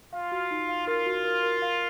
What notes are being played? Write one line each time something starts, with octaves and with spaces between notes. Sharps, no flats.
F4 F5
F#4
D#4
F5
F4 A#4
F#4
A#4
A#4
F5